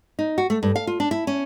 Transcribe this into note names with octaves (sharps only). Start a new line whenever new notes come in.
D#4
F#4
A3
G2
F5
F4
D4
E4
C#4